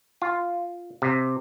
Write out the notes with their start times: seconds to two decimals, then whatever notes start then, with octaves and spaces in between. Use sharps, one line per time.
0.22 F4
1.02 C3